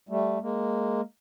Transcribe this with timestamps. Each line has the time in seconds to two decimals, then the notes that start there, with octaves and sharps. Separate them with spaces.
0.09 G3 A3
0.42 G#3 A#3